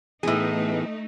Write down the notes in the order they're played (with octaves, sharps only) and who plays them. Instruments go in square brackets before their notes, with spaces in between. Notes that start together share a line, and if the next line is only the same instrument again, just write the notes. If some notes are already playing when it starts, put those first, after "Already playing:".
[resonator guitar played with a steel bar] A2 G#4 [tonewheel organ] E3 B3 [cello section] A3 D#4